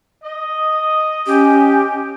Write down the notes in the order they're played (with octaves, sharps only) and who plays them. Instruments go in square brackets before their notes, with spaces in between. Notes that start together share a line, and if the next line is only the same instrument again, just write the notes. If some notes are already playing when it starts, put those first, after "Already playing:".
[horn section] D#5
[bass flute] C#4 [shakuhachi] G4